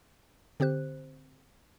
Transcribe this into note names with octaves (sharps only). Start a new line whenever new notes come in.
D3 C4 G4 C5 F#6